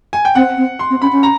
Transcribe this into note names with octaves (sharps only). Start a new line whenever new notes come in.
G#5
G5
C4 F#5
C4
C6
C4
C#4 B5
C#4
A#5